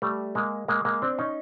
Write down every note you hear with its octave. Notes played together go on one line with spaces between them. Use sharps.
G3 A3
G#3 A#3
G#3 A#3
G#3 A#3
C4 D4
C#4 D#4